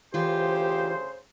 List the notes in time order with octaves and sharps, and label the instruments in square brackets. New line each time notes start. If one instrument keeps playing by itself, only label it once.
[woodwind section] D2 C#3 C5 [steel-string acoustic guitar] E3 F4 [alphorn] G4